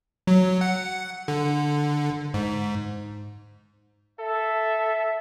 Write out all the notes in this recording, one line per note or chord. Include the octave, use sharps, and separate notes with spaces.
F#3
F#5
D3
G#2
A4 E5